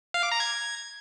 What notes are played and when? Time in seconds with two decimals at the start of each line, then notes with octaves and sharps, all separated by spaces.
0.14 F5
0.23 D6
0.32 A#5
0.40 G#6